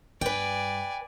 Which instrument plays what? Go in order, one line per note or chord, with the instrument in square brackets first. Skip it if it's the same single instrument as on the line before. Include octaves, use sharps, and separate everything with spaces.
[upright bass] G2 [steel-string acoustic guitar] B4 G5 [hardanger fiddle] D5 G#5